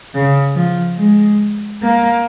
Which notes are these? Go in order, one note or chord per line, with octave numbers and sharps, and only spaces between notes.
C#3
F3
G#3
A#3